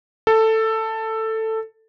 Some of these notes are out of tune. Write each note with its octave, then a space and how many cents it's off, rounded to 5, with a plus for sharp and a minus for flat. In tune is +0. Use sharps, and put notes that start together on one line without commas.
A4 +10